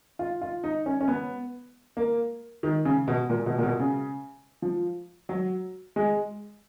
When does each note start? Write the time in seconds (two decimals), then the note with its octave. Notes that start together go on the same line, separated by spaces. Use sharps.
0.19 F4
0.41 F4
0.64 D#4
0.86 C#4
1.01 C#4
1.08 B3
1.97 A#3
2.63 D#3
2.85 C#3
3.08 B2
3.29 A#2
3.46 B2
3.58 A#2
3.63 B2
3.79 C#3
4.62 F3
5.29 F#3
5.96 G#3